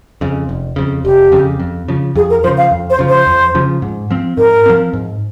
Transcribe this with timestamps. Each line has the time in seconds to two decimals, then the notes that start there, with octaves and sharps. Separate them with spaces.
0.21 F2 C#3
0.49 F1
0.76 F2 C#3
1.04 F1 G4
1.32 F2 C#3
1.60 F2
1.88 C#3 F3
2.15 F2 G#4
2.30 A#4
2.43 C#3 F3 C5
2.57 F5
2.71 F2
2.90 C5
2.99 C#3 F3
3.08 C5
3.27 F2
3.55 C#3 F3
3.82 G#2
4.11 F3 C4
4.37 G#2 A#4
4.66 F3 C4
4.93 G#2